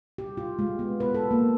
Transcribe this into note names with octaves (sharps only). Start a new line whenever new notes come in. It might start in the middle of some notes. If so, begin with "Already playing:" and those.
G4
F4
G#3
B3
B4
A4
A#3